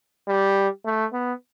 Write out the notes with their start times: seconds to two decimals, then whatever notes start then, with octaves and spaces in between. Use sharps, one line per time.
0.28 G3
0.85 A3
1.13 B3